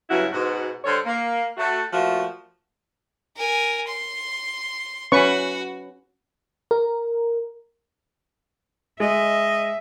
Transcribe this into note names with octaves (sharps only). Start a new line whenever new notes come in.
G2 C#3 F#3 B3 E4 F#4
G#2 B2 F#4
D3 G3 A4 C5 C#5
A#3
A3 F#4
A#2 F3 A3 F#4
A#4 G#5
C6
C#4 F#4 B4 C#6
A#4
G#3 D#5 E5